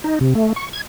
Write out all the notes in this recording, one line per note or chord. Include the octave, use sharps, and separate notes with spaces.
D#4
C3
A3
C#6
G#6